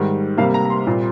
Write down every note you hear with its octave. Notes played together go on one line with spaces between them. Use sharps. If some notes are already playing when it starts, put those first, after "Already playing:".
Already playing: G#2 D#3 G3
C3 G3 A#3 F5
A#5
A#5
C6
A#2 G3 C4